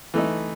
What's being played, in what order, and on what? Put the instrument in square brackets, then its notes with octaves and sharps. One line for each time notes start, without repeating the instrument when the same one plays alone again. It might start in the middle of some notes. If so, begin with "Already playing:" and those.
[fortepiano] E3 A3 D#4